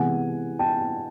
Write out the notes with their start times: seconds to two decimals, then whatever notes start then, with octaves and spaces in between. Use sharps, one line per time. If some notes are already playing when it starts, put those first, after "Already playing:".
Already playing: C3 E3 G#3 B3 F#5 G#5
0.59 G5 A5